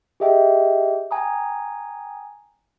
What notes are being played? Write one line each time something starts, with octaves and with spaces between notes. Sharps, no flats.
G4 G#4 D#5 E5 G5
G5 G#5 A#5 D#6